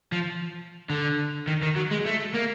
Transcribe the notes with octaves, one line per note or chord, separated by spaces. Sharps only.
F3
D3
D#3
D#3
F#3
G#3
A3
A#3